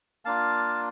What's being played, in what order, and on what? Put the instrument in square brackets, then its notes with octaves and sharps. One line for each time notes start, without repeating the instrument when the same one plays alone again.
[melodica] A#3 D4 F4 F5 A5